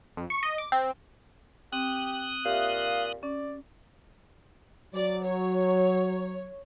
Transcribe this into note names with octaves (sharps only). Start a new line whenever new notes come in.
F2
C#6
D#5
D6
C4
C4 G4 D#6 F#6
A#2 G4 E5 F5
C#4 D5
F#3 D5
C#5